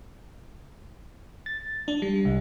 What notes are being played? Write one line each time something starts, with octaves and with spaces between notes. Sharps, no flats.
A6
D4
G3
C2